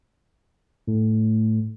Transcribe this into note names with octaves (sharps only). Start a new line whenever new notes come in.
A2